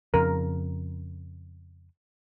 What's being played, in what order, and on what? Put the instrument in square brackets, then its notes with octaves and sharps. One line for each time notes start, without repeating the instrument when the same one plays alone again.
[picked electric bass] F2 C#3 [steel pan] A#4